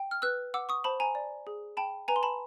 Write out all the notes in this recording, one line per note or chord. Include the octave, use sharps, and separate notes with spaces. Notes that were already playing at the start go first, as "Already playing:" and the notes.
Already playing: G5
F6
B4 E6 F#6
F#5 D6 E6
C#6 D#6
C5 A5 B5
G#5 A#5
D5
G#4
G5 A5 B5
B4 G#5 A#5
C6
A5 B5